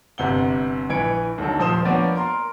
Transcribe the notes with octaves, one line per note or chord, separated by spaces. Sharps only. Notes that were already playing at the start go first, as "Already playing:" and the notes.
G1 C3 F#5 G7
A#1 E3 B4 G#6 C#7 D7
D#2 D3 F#3 A4
D#1 F3 C5 D#6 E7
F3 A#3 B3 D4 C#5 D5
A#4 C6